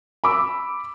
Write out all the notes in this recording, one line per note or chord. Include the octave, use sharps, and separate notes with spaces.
B5 D6 E6